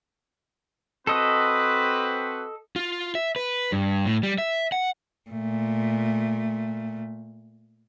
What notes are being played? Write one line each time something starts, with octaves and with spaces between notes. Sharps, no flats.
C4 F#4 A4 B4 D#5
F4
E5
B4
G2
A2
G3
E5
F#5
A#2 A3